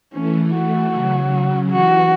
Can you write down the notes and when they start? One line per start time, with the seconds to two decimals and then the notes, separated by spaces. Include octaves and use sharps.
0.14 E3 A3 C#4
0.54 F#4
0.92 C#3 F#3
1.70 E3 F#4